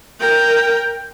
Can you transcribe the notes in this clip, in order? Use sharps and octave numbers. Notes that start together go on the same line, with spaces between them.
A#4 G5